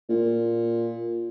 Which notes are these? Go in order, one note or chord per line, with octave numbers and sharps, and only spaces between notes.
A#2